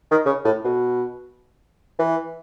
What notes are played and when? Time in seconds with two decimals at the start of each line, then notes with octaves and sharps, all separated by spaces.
0.11 D#3
0.26 C#3
0.45 A2
0.64 B2
1.99 E3